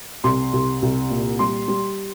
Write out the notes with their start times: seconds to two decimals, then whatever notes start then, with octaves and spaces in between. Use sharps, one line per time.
0.24 C2 C6
0.53 C2
0.82 C2
1.10 A#2
1.39 G3 C6
1.68 G3